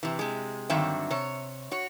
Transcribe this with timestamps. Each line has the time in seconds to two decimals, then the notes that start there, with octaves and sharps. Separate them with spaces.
0.03 C3 E3
0.19 C3 G#3
0.70 G2 D3 D#3 F#3 C4 E5
1.11 C3 C#5
1.71 F#4 C#5